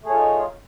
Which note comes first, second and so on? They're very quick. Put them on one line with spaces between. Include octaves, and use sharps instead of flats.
A3 G#4 C#5 F4 D#4